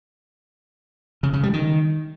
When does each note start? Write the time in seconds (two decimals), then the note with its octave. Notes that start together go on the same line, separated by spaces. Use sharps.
1.23 C#3
1.33 C#3
1.43 G3
1.53 D#3